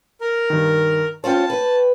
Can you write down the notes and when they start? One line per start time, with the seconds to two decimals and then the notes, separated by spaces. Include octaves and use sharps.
0.21 A#4
0.50 G2 D#3
1.24 C#4 F4 C5 C#5 G5 A5
1.50 B4